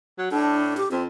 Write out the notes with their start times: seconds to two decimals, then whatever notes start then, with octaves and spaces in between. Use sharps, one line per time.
0.18 F#3
0.32 A2 D4
0.77 G4
0.91 F2 C4